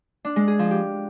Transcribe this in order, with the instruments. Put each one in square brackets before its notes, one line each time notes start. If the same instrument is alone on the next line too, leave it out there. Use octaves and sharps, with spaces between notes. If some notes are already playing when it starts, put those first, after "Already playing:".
[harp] D4
G#3
G#4
F3
G4